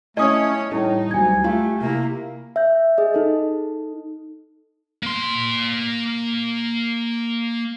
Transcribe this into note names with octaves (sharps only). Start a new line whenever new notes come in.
A3 C#4 E4 C#5 D#5 D#6
A2 E3 G3 D#4 A4
D2 F#3 G3 G#5 G#6
A3 F4 G4
C3 A#3 E4
E5 G6
G#4 D#5
D#4 A4
A#3 C6